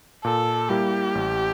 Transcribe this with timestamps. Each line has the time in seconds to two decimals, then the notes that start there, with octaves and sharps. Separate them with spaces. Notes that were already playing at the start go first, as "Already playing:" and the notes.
0.24 A#2 A4
0.69 G3 A#3 E4 G4
1.15 A1